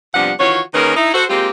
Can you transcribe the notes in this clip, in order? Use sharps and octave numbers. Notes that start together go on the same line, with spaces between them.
C3 F3 G3 B3 D4 F#5
D#3 E3 F4 F#4 C#5
D#3 A#3 C#4 G#4 A#4 B4
D#4 E4
F#4 A4 C5
G#3 A#3 C4 F4 G4